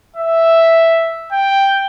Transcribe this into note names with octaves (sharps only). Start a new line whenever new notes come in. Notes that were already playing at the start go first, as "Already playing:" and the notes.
E5
G5